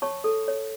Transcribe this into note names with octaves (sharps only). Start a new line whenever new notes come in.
C#5 A5 C#6
A4
C#5